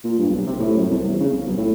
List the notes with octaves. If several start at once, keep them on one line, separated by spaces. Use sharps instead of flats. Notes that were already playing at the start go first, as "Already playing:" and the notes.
A#2
G2
B1
C3
A2
F#2
C2
E2
C#3
C2
B1
A2